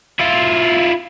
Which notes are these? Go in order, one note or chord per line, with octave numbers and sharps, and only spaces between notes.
E4 F4